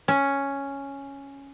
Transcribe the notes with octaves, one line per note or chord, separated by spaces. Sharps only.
C#4